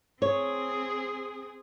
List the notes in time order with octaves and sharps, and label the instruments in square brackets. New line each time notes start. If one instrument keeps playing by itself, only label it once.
[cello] C4 G#4 [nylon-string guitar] C#5